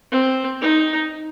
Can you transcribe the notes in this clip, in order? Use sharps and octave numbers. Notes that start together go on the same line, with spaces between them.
C4
D#4